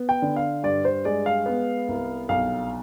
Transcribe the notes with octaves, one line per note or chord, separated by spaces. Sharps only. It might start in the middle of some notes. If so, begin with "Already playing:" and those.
Already playing: B3
G5
D3
F5
G2 D5
C5
G#3 D5
F5
B3
C2
B1 F5